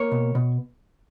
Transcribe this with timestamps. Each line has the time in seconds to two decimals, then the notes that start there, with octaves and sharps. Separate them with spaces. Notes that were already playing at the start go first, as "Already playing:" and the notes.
Already playing: A#3 C#5
0.12 B2
0.35 B2